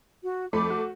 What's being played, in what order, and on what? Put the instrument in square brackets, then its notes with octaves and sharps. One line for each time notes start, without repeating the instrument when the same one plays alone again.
[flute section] F#4
[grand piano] F2 B5 [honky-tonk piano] A3 [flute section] D6
[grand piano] F#4